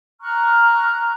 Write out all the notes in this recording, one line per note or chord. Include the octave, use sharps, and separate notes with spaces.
A#5 C#6 F6 F#6